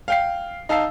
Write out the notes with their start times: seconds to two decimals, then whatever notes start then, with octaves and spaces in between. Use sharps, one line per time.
0.08 F5 G5 C7
0.69 D#4 F5 A5 E6 C7